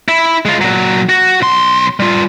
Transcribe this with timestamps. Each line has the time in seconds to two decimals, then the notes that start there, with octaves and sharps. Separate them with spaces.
0.08 E4
0.45 G#3 F4
0.61 A#2 F#3
1.09 F#4
1.41 B1 C6
2.00 G3 F4